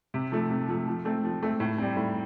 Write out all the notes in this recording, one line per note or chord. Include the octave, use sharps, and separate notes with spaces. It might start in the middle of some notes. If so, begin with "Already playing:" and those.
C3
F3 A3
C3
F3 A3
F3
A3 C4
F3
A3 C4
A2
G3 C4
A2